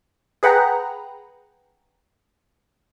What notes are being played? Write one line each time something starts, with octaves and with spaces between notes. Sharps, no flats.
G#4 B4 F#5 G5 A#5